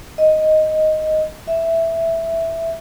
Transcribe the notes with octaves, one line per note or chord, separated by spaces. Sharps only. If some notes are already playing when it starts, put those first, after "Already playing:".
D#5
E5